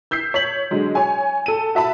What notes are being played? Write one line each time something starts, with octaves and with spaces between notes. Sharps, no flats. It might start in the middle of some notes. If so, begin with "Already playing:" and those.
E6 G6 B6 C7
C#5 B6 F#7
D3 F#3 G#3
C#5 G#5
A4 D#7
F#4 E5 A5 B5